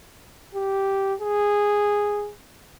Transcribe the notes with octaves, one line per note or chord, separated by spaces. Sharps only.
G4
G#4